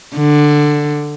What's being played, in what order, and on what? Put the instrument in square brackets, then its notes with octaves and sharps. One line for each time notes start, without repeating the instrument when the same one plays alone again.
[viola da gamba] D3